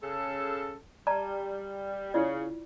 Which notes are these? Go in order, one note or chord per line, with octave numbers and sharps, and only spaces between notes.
C#3 A4
G3 D5 A5 A#5
C#3 E4 F4 D5